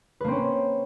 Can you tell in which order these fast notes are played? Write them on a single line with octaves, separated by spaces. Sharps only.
B4 A#3 C4 C#4